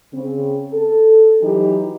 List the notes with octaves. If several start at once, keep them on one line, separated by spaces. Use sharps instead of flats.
C#3 C4
A4
E3 F#3 D#4 G4